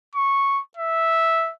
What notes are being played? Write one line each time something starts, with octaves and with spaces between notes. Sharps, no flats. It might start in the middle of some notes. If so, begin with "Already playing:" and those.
C#6
E5